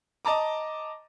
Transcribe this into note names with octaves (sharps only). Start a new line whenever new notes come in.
D#5 A5 A#5 D6